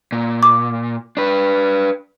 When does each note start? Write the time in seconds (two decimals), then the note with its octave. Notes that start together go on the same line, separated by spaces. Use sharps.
0.12 A#2
0.43 D6
1.17 D4 B4